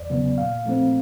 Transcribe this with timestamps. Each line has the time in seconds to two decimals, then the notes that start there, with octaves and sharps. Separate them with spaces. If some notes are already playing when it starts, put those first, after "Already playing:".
Already playing: E2 D5
0.10 C#3 F#3 B3
0.38 A#2 F5
0.66 F3 A3 C4